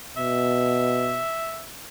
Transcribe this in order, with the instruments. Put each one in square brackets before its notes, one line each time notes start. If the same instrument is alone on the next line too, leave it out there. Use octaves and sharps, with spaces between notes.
[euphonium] B2 [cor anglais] E5